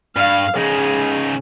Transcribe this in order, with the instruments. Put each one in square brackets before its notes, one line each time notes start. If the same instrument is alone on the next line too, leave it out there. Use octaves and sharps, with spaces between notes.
[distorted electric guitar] G2 [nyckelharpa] F5
[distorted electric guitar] C#3 D#4 [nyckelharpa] G#4